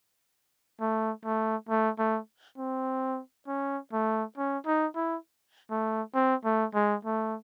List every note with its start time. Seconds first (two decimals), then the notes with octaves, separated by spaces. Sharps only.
0.81 A3
1.25 A3
1.69 A3
1.99 A3
2.58 C4
3.48 C#4
3.93 A3
4.37 C#4
4.66 D#4
4.96 E4
5.71 A3
6.15 C4
6.45 A3
6.75 G#3
7.05 A3